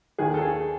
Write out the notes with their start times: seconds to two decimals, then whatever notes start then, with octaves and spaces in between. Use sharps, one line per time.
0.19 D#2 D#3 G#4
0.34 A4
0.41 G#4